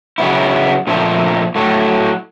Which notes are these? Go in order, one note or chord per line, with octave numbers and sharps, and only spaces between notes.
C#3 F#3 B3 E4
A#2 F3 A3 C4
A2 F#3 A3